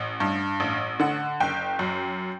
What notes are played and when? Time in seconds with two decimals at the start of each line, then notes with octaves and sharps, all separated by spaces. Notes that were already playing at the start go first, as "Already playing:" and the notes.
Already playing: A1
0.20 G2
0.60 A1
1.00 D3 F#5
1.40 F#1 G5
1.79 F#2